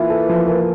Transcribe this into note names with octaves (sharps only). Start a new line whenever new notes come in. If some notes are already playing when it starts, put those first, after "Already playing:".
Already playing: E3 A#3 F4
A4
F3
A#3